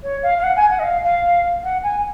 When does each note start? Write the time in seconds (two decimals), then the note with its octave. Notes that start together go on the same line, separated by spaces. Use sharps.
0.03 C#5
0.23 F5
0.38 F5
0.43 F#5
0.57 G#5
0.70 F#5
0.79 D#5
0.83 F5
1.04 F5
1.64 F#5
1.83 G#5